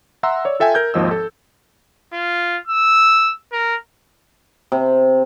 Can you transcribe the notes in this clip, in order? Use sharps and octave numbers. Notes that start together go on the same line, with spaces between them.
E5 F#5 A#5 C6 E6
C#5 D5
F4 A4 E5 G5 G#5
A#4 G6 G#6
G#1 D#2 F3 D#5 E6
A4
F4
E6
A#4
C3